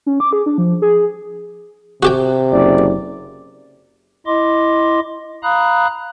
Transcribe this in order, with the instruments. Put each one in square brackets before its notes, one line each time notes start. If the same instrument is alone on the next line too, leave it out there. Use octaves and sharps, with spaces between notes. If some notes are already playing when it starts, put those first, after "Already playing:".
[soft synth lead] C#4
D6
G#4
D4
F3
G#4
[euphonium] C3 [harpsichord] F#4 G4 G5
[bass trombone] F#1 [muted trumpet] D5
[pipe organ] E4 D#5 C6 D6
F5 A#5 B5 D#6 F#6